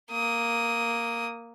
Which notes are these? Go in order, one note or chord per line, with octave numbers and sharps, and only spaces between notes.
A#3 D#6